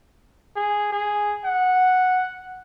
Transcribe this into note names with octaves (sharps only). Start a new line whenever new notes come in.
G#4
G#4
F#5